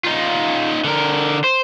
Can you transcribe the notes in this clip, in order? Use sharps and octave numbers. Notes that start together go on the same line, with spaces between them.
D#4 F4
D3 A#4
C5